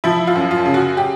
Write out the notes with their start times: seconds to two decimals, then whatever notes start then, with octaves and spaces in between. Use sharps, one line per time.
0.04 F3 E4
0.27 F4
0.36 F#2
0.51 F4
0.66 C#3
0.74 F#4
0.97 G4